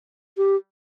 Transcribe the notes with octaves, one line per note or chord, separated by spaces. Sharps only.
G4